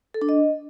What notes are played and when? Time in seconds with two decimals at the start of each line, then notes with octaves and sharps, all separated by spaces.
0.14 A4
0.22 D4
0.29 D#5